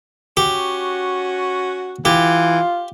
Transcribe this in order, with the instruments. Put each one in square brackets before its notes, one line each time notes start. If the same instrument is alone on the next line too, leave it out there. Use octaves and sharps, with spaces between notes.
[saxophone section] C#4 F#4 [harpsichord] G4
[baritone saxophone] E3 [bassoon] F4 [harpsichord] G4